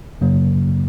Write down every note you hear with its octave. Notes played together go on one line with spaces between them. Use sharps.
F#2 C#3 F#3 A#3